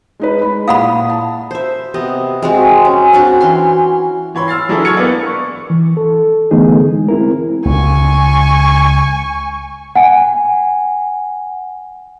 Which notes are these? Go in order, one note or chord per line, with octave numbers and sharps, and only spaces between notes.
G#3 D#4 B4
G#3 B5
A#2 E4 F5 F#5 B5 D#6
A5
C5 E5
C3 B3 D#5
G#3 C4 F#4
C#4
C4 D4 F#4
E3 C#4 C6
E3 C#5 B5 C6
E6 F6 A6 C7
E3 F#3 D4 E4 G#4 A4
C#6 E6 F6 G#6 C#7
A#3 B3 B4 D5
C#6
E3
A4
D3 E3 A3 B3 D#4 G#4
G#3
C4 E4 A#4
C#2 G#5 C#6
F#5 G#5